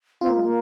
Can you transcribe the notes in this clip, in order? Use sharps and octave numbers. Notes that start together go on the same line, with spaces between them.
C4 F4
A#3
G#3
A#3